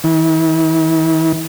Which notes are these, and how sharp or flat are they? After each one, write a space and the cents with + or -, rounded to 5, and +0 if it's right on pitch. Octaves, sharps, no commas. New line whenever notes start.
E3 -45